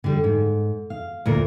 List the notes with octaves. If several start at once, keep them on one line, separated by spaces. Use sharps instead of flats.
D3 G3
G#2
F5
D2 A#2 A#4